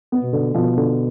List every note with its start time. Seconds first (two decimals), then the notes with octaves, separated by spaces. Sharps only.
0.12 B3
0.23 B2
0.33 D3
0.54 B2 F3
0.77 D3